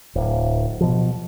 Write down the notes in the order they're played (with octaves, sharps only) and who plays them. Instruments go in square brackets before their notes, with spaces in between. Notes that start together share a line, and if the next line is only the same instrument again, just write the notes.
[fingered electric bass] D1
B2 F3